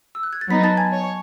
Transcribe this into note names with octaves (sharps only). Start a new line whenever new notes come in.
E6
F#6
G#6
A6
F#3 B3 D#4 B5 B6
A5 A6
G#5 G#6
C#5